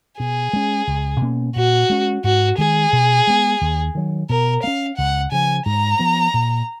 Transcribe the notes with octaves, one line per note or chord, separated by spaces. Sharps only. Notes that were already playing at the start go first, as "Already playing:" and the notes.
B2 G#4
G#3 C#4
C#2
B2 A#3 C#4
A#2 F#4
G#3 C#4
G#2 F#4
D#3 G#3 G#4
B2
G#3 B3
D#2
D#3 F#3
B2 A#4
A#3 C#4 F5
C#2 F#5
C#3 F3 G#5
G#2 A#5
F3 B3
A#2